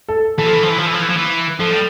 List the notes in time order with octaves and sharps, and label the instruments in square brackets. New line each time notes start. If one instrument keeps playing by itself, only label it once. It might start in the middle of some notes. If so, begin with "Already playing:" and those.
[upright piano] A4
[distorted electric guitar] E3 [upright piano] A4
[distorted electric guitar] F3
E3
F3
E3
F3
E3
F3
E3
F3
E3
[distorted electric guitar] F3 [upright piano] A4
[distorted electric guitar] G3